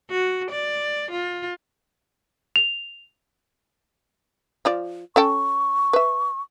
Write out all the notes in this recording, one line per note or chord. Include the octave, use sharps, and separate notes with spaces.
F#4
D5
F4
F7
F3 F4 D5
C#4 A4 G5 C#6
B4 E5